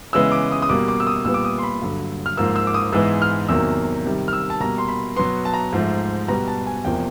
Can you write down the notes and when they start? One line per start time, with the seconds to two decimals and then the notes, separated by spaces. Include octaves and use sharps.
0.13 C#3 E3 G#3 B3 E6
0.32 D6
0.52 D#6
0.62 D#6
0.69 B2 G3 A#3 D6
0.88 D6
1.00 E6
1.07 D#6
1.25 A#2 G3 B3 E6
1.34 D6
1.44 D#6
1.58 C6
1.63 B5
1.81 G2 D3 F#3
2.26 F6
2.37 G#2 F3 A#3 E6
2.56 E6
2.67 D6
2.74 D#6
2.93 G#2 E3 G#3 B3 E6
3.22 F6
3.48 E2 C3 D#3 F#3 A#3 E6
4.06 C3 D#3 G3
4.28 F6
4.33 E6
4.50 A5
4.60 B2 G3 A#3 A#5
4.78 C6
4.88 B5
5.16 B2 F#3 B3 C6
5.45 A5
5.54 A#5
5.73 G#2 F3 A3
6.28 B2 G3 B3 A#5
6.48 A5
6.66 G#5
6.85 E2 C3 F3 A#3 G5